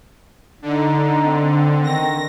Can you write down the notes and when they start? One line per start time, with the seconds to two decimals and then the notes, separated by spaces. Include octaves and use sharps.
0.62 D3 D#4
1.25 C4
1.84 D#3 A#6